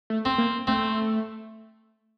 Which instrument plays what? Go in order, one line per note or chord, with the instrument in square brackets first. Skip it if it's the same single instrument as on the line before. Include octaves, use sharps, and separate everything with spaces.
[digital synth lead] A3
[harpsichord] C4
[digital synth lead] A#3
[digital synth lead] A3 [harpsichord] C4